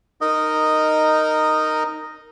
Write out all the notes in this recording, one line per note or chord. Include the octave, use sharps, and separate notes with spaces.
D#4 A#4 D#5 D#6